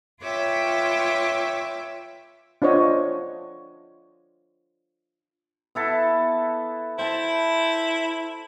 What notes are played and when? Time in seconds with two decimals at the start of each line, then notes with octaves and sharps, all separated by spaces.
0.21 F4 B4 C#5 E5 G5 D6
2.62 D4 F4 C5 C#5 D#5 F#5
5.75 B3 E4 A4
6.98 E4 C5 A5